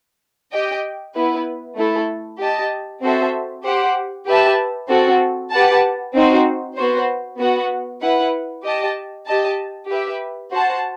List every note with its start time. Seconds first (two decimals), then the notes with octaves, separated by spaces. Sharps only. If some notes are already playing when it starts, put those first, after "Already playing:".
0.52 G4 D#5 G5
1.15 B3 E4 B4
1.77 A3 E4 A4
2.39 G4 D#5 A5
3.01 C4 F#4 A4 C5 E5
3.64 G4 C5 F#5
4.27 G4 B4 E5 A5
4.89 C4 F#4 A4
5.51 G4 B4 F#5 A5
6.14 C4 D#4 F#4 C5
6.76 B3 F#4 C5
7.39 B3 F#4 B4 F#5
8.01 E4 B4 F#5
8.63 G4 D#5 A5
9.26 G4 D#5 A5
9.88 G4 B4 E5
10.51 F#4 C5 F#5 A5